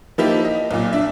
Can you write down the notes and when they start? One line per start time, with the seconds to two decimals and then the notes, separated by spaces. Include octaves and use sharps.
0.18 F3 A#3 D#4 E4 G4
0.45 D#5
0.71 B1 A#2
0.93 D4 E5